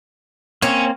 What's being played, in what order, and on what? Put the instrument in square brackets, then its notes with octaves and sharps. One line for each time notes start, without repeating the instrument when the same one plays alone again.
[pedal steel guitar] A#3 C4 [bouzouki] C#4